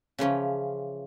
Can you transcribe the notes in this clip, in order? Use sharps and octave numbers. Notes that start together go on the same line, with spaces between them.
C#3 E3 F3 C#4